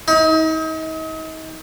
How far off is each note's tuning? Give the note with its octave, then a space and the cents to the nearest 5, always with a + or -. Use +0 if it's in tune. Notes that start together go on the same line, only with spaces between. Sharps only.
D#4 +40